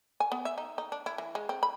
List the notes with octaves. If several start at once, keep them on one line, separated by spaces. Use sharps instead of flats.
G#5
B3
E5
D#4
D#4
D4
E4
E3
G#3
C4
B5